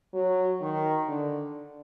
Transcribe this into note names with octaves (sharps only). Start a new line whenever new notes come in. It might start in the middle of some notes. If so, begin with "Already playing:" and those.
F#3
D#3
D3